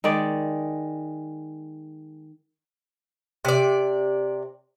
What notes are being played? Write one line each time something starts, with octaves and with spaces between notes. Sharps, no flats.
D#3 G#3 D5
C3 D5